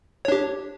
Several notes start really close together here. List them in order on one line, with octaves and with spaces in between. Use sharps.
C#5 D4 G4